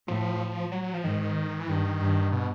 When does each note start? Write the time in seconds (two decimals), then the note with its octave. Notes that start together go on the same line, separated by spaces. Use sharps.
0.08 A2 F3
0.72 F#3
0.82 F#3
0.94 F3
1.04 G#2 D#3
1.59 E3
1.68 G2 D#3
2.00 G2
2.32 B2